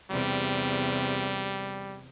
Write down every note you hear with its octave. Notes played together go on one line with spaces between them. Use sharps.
E2 C3 G3